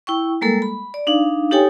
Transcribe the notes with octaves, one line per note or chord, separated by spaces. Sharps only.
E4 G5 C#6
G3 G#3 A#3 A4 A#4
B5
D5
D4 D#4 F5
D#4 G4 A4 C#5 G5 G#5